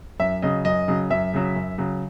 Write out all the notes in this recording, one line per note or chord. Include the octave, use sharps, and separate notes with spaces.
F#2 E5
C#3 F#3 D#5
F#2 D#5
C#3 F#3
F#2 E5
C#3 F#3
F#2
C#3 F#3